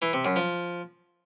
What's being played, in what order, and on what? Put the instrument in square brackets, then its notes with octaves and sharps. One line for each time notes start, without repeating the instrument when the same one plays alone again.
[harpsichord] E3
C3
F#2
F3